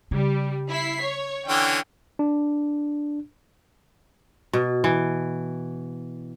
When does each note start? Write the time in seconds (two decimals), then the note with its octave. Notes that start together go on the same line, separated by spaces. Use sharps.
0.11 C#3 G3
0.70 E4 B6 C7
1.03 C#5
1.48 D3 E3 C#4 G5
2.19 D4
4.53 B2
4.84 E3